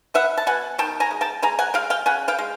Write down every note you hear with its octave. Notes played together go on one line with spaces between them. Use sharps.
B3 E5 F#5
A5
B2 F#5 G#5
D#3 G5 A5
G#5 A#5
G#3
G5 A5
G#3 G#5 A#5
F#5 G#5
G#3 F5 G5
F5 G5
C#3 F#5 G#5
F5 G5
G#3